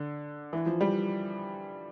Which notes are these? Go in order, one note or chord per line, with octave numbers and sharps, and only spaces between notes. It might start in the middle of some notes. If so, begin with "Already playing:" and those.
Already playing: D3
E3
F3
G3